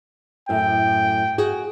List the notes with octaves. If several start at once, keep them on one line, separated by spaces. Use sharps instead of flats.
F#2 A2 G5
F#4 G#4